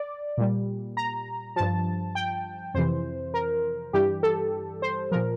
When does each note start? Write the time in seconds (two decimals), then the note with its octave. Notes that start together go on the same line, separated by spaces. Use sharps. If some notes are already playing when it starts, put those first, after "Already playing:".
Already playing: D5
0.37 A#2 G3
0.97 A#5
1.56 G2 F3 A5
2.15 G5
2.74 F2 C3 E3 C5
3.34 A#4
3.93 G2 E3 G3 G4
4.23 A4
4.82 C5
5.11 A#2 F3 A#4